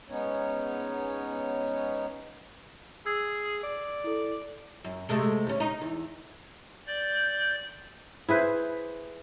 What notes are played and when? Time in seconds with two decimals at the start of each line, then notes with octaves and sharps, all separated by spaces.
0.09 G#3 B3 C#4 D#4 C#5
3.06 G#4 E6 G#6
3.63 D5
4.04 E4 A4
4.84 F#2
5.09 C3 G#3 A3
5.47 D2 C#4
5.60 D#4
5.82 E2
6.87 D5 G6
8.29 E4 G#4 B4 C5